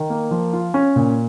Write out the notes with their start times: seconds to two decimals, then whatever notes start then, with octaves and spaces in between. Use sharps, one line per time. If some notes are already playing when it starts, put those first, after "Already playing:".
Already playing: D#3
0.10 A#3
0.31 F3
0.53 F4
0.74 C#4
0.96 A#2